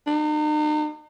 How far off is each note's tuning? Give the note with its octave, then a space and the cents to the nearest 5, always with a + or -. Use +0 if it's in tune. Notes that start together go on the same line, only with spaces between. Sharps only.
D#4 -40